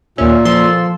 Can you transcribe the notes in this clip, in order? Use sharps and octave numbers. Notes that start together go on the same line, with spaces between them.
D#2 A#2 C#4 E5
F3 A4 C6